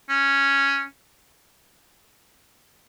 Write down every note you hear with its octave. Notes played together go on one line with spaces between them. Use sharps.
C#4